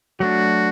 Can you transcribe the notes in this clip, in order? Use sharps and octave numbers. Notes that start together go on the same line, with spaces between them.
F#3 A3 D4 F#4